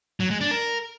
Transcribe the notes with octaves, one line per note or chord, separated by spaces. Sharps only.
F#3
G#3
D4
A#4